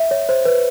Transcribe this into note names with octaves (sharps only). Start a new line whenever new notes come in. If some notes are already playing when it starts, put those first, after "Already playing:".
Already playing: E5
C#5
C5
B4